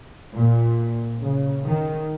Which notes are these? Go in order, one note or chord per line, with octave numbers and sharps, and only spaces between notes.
A#2
C#3
D#3